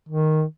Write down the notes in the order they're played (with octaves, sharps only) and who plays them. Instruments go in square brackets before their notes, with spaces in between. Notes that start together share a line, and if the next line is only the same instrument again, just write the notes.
[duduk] D#3